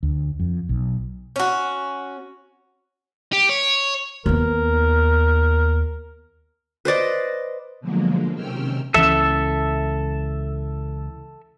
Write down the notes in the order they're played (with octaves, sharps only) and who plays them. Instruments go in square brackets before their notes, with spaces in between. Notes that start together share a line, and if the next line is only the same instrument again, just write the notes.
[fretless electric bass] D2
F2
B1
[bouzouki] C#4 F#4
[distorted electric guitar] G4
C#5
[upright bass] D#2 B3 [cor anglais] A#4
[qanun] B4 C5 D5 D#5
[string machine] B2 D3 F3 F#3 G#3 A#3
C3 D#3 C#4 G5 E6 F6
[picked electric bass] C#2 E3 C#4 [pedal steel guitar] A4 E5